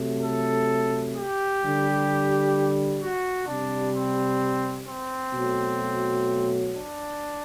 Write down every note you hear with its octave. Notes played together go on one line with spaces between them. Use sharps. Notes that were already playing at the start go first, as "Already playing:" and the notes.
Already playing: C3 F#3 A3
A4
G4
D3 G3
F#4
C3 G3 D4
C4
C4
B2 F#3 A3
D4